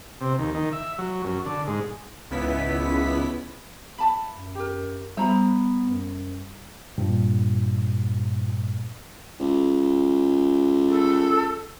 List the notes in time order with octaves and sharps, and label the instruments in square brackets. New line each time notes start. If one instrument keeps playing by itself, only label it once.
[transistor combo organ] C3
D#2
D#3
E5
F#3
F#2
D3
G#2
[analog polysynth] G#1 C#2 C#3 B3 E4 B6
[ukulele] E5 A5 B5
[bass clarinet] F#2
[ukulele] G4 A#4
[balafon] G3 [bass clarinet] B3 [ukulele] C5 A#5 B5
[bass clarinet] F#2
[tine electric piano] G2 A#2
[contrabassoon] C#2
[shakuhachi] A4